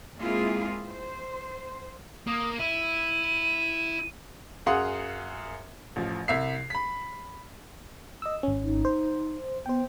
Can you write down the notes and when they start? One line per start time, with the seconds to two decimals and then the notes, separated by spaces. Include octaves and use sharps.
0.19 G#3 A#3 C4 E4 F4 G#4
0.88 C5
2.27 A#3 D#6
2.59 E4 D#7
4.66 F#2 G#4 F5 F#5 C6 D#6
5.96 A1 F3
6.28 C2 E5 C7
6.70 B5 B6
8.22 D#5 E6
8.43 G#1 C#4
8.63 D#4
8.85 C5
9.66 B3 C5 G5